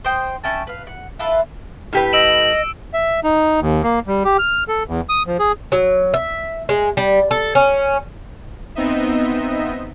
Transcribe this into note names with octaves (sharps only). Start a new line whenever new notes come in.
C5 D#5 G5 C6
C#4 E4 G5 A5
B4 F5
F#5
E4 F4 A4 B4
A2 G4 B4
D#5 E6 D7 E7 F#7
E5
D#4
D#2
A#3
G3
G4
F6
A4
E2
D#6
F3
G#4
F#3
E5
G#3
G3
A4
C#4
B3 C4 D#4 D#5 E5